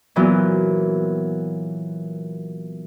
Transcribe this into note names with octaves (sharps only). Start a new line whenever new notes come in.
A#2 E3 F#3 B3